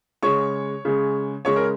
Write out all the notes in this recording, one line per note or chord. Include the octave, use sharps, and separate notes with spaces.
C#3 G#3 C#5 C#6
C#3 G#3
C#3 G#3 C#5 C#6
A#4